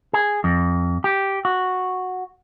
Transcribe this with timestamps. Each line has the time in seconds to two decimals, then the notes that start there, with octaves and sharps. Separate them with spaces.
0.13 G#4
0.44 F2
1.04 G4
1.45 F#4